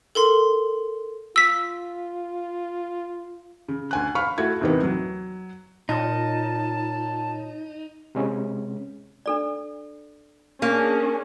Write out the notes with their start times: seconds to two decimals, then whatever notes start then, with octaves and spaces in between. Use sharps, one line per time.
0.15 A4 A#4 C6
1.36 F4 E6 B6
3.68 C#3
3.91 D2 G#5 F#6
4.15 F5 B5 C#6 F6
4.38 A3 E4 F#4 G#6
4.61 D#2 C3 D#3 E3 B3
4.83 F#3
5.89 A#2 D#4 F4 C#5 A5
8.15 C3 G#3 C#4
9.26 D4 A4 D5
10.62 A#3 C#4 D4 G#4